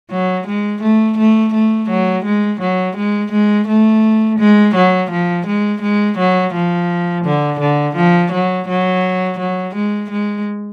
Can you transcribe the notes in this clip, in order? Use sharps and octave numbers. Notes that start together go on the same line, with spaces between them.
F#3
G#3
A3
A3
A3
F#3
G#3
F#3
G#3
G#3
A3
G#3
F#3
F3
G#3
G#3
F#3
F3
D3
D3
F3
F#3
F#3
F#3
G#3
G#3